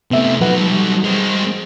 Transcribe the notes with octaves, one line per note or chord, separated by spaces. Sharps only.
C3 A3 B3 E5
F3 F#3 D#4 B4 F#5
G3
G#3 C4